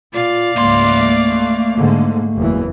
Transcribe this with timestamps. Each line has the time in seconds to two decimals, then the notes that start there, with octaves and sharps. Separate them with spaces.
0.13 A#2 F4 D5 F5
0.56 C#2 G#2 A3 A#3 C6
1.75 G#2 D3
2.37 F#1 E2 E3